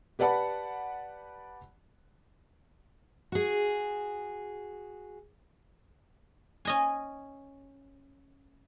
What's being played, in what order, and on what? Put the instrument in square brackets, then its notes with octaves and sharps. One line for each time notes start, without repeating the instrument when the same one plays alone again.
[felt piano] G4 B4 D5 F#5 A5 B5
[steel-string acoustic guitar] F#4 G#4
[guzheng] C#4 D#5 G#5